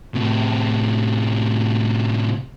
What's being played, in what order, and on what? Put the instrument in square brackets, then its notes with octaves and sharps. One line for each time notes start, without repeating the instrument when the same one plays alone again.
[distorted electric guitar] A2 C3